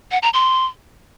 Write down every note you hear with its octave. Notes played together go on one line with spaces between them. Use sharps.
F#5
A#5
C6